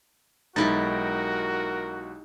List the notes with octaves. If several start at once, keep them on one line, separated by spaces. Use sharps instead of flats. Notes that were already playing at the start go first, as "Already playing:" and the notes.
B1 G#3 D#4 E4 F#4 G4 A#4 A6